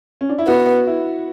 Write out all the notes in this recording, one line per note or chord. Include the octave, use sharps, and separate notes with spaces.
C#4
D4
E4
B3 F#4
E4